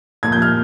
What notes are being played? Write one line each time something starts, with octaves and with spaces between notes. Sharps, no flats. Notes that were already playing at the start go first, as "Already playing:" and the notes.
A#2 F3 A#3 G#6
G6
F6